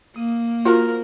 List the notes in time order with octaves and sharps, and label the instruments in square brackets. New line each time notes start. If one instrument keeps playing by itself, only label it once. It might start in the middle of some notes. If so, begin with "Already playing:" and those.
[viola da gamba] A#3 [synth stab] D#6
[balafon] F4 [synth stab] F#4 C5 F5 [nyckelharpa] A#4